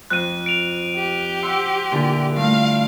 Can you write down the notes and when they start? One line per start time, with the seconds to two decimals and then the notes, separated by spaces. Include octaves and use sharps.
0.10 F2 F#6 D#7
0.46 D7 F7
0.96 G4
1.43 F#5 C6 E6
1.91 A#2 D3 E4
2.36 G2 A3 F5